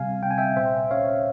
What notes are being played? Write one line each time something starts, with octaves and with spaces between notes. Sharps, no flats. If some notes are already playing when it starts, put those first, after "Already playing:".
Already playing: C3 G3 F5 G#5
C4 G5
G#5
E5 G5
A#2 C5 E5
C#4 C#5 F5